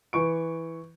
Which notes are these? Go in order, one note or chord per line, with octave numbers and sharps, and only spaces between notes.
E3 C#6 D7